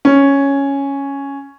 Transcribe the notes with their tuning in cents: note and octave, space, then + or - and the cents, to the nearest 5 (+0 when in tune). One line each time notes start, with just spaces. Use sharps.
C#4 +0